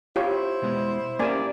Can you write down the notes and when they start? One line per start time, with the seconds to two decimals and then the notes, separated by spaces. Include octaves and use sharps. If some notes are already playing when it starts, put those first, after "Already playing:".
0.16 E4 F4 G4 C5 C#5
0.62 B2 G#3 B3
1.19 A#3 C#4 G4 D5 E5 G#5